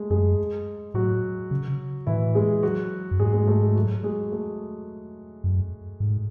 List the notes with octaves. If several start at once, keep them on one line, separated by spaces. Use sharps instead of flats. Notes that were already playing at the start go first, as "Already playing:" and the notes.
Already playing: G#3 A3 G#4 A4
F#2 G#3 G#4
A2 F#3 F#4
C#3
A2 E3 E4
G#3 G#4
F#3 F#4
F#2
G#2 G#3 G#4
G#3 G#4
A3 A4
G#3 G#4
F#3 F#4
G#3 G#4
A3 A4
F#2
G#2